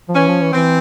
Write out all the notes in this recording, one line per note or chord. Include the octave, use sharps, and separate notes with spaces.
F3
E3 C#4
F3
E3
E3 C4